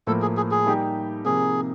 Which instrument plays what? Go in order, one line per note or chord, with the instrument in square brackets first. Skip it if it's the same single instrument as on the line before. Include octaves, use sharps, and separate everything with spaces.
[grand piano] A2 F3 A#3 [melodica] A4
[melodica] G#4
G#4
G#4
[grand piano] G3 A#3 D#4 G4
[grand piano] C3 F3 A#3 D#4 [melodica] G#4